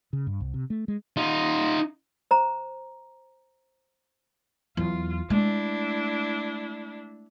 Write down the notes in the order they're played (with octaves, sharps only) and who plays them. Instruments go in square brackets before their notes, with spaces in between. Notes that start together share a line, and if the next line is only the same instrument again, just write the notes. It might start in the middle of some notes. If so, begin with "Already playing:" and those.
[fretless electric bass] C#3
G2
C2
C3
A3
G#3
[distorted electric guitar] D#4 F4
[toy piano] C5 A#5
[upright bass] E2 F#3 [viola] F4
[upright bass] G#3 A3 [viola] D4 E4